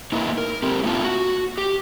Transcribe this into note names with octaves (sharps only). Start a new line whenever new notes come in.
A#3 D#4 E4 B4
A#4
C4 D#4 G4
A3 A#3 E4 F4 A5
F#4
G4